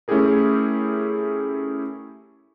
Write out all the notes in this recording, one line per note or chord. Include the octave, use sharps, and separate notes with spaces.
A3 C#4 E4 G4 G#4 A#4